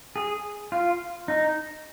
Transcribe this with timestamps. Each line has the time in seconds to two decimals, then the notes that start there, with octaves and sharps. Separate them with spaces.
0.16 G#4
0.72 F4
1.28 D#4